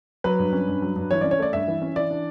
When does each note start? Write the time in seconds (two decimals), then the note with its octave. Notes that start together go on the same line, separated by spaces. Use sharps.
0.24 F#3 B4
0.39 G2
0.53 C#4
0.68 G2
0.82 F#3
0.96 G2
1.11 E3 C#5
1.21 C#4 D5
1.31 C#5
1.39 A3 D5
1.53 G2 E5
1.68 E3
1.82 C#4
1.96 E3 D5
2.10 D4